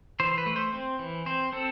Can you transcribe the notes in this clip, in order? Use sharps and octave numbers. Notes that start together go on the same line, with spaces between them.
E3 C5
B4
A3
C5
C4
E3
C4 C5
C4 A4